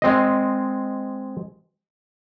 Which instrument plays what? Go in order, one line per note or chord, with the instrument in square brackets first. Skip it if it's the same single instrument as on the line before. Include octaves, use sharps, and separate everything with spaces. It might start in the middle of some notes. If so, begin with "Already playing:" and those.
[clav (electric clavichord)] G#3 C4 D#5